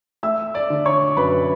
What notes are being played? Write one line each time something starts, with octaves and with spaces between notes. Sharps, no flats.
A3 E5 E6
D5 D6
D3
C#5 C#6
F#2 B4 B5